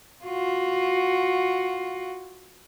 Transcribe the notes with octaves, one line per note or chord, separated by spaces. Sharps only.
F4 F#4